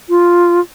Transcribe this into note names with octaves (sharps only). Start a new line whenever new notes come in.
F4